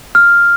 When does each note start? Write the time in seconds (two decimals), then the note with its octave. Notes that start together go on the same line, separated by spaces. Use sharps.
0.15 F6